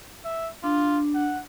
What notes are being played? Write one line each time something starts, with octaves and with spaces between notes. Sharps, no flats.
E5
D4 F4
F#5